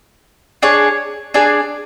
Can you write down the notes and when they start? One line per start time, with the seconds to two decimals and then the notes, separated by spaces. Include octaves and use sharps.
0.62 D4 G#4 C#5
1.34 D4 G#4 D5